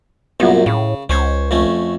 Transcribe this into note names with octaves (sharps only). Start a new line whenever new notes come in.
C2 F#2 A#2 B3
A2 C#3
C#2 C#4 C5 C#5
F2 A3 C#4